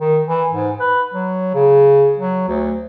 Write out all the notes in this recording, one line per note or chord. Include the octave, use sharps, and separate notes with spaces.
D#3
E3
G#2
B4
F#3
C#3
F#3
D2